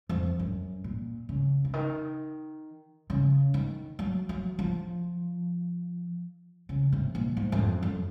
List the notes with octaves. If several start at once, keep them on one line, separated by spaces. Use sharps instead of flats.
F2
F#2
A#2
C#3
C#3
D#3
C#3
D#3
F#3
F#3
F3
C#3
C3
A#2
G#2
F#2
F2
F#2